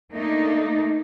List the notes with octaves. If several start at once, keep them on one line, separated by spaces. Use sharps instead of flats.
A3 A#3 D4 D#4